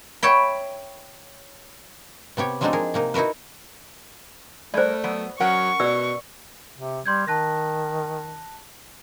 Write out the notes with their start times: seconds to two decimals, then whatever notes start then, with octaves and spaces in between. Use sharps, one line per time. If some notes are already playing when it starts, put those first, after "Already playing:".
0.23 C#5 E5 G5 B5
2.37 C3 B3 G4 C#5
2.61 F3 F#3 G#3 C4 D4 D#4
2.73 G#4 A#4
2.94 C3 A#3 D#4
3.14 D#4 E4 F#4 A#4 B4
4.74 G3 A3 A#4 C5 D5
5.04 F#3 B3
5.40 F#3 C#4 A#4 F#5 C#6
5.80 B2 B4 D5 E6
6.78 C3
7.06 G3 C6 G6 G#6
7.27 D#3 A5 F#6 A#6